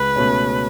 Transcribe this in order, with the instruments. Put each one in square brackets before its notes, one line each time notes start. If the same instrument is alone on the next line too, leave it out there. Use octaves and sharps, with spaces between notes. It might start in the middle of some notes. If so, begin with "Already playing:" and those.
Already playing: [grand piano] C#2 [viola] B4
[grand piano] B2 A3 C#4